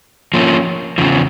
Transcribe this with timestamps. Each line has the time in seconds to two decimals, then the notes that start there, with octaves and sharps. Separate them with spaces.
0.34 F3 A#3 C#4
0.98 E2 C#3 F3